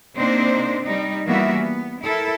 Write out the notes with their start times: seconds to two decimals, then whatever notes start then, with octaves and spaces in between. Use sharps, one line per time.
0.15 C3 A#3 C4 D4 D#4 C5
0.82 G3 D#4
1.27 E3 G3 A#3 B3 F#4 E5
1.60 B3
2.02 E4 A4 A#4